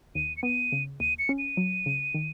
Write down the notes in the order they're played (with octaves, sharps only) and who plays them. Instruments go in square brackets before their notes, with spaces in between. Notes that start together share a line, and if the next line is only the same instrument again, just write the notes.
[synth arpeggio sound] D#2 [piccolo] D#7
[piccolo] C#7
[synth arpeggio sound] B3 [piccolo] D#7
[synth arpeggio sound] C#3
[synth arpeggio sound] D#2 [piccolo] D#7
[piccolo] C#7
[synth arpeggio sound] C#4
[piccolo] D#7
[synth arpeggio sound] F#3
C#3
D#3